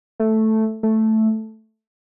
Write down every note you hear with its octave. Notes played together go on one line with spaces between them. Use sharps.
A3
A3